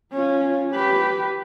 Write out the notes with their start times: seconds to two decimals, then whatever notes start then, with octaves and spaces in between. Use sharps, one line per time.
0.12 C#4 F4
0.72 G4 B4